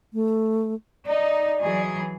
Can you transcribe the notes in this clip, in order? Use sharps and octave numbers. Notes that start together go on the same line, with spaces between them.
A3
D#4 D5
E3 F#3 G#4